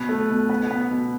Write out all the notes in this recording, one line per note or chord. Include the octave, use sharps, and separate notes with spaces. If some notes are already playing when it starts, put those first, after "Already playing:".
Already playing: B2 B4
A3
B2
B3
B3
B2